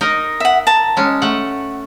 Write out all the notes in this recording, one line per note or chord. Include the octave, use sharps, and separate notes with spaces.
D#4 A#4 D#5
E5 F#5
A5 A#5
G#3 C#4
A3 F#5